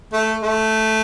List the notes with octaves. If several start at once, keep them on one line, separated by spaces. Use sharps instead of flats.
A3
A3